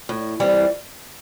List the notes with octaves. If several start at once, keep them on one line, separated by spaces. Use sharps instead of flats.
A2
E3 G3 C4